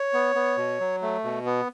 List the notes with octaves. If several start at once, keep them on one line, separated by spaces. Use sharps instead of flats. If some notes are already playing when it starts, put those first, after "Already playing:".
Already playing: C#5
B3
B3
B2
F#3
A3
B2
B3